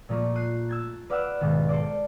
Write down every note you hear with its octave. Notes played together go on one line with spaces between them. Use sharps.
A#2 F3 A3 A#3
F#6 C7 D#7
E6 G#6 A6
B4 D5 F5 F#5 E6 F#6
B1 G#2 D#3
A4 C5 D5